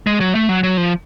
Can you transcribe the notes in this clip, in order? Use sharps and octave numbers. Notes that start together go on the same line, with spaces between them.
G#3
F#3
A3
F#3
F#3
F3